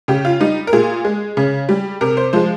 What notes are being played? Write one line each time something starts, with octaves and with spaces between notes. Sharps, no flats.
C#3 G4
F4
G3 D#4
A#4
A#2 G#4
G#3
C#3
G3
C3 A#4
C5
F3 G#3 C5